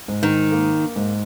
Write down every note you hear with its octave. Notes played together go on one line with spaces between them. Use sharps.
G#2
D#3
A#3
G#2